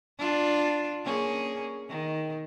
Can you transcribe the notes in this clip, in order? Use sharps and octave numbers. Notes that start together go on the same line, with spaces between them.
D4 F4
A#3 C#4 G#4
D#3